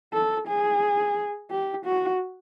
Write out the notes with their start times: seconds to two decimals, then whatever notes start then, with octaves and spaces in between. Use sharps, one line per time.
0.14 A4
0.48 G#4
1.50 G4
1.85 F#4